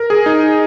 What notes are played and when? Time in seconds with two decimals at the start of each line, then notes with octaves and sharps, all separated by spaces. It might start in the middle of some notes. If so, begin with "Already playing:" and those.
Already playing: A#4
0.10 G#4
0.26 D#4